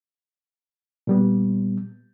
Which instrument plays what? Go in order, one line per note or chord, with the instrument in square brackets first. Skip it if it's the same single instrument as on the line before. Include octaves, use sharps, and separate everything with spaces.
[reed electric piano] A#2 G3 B3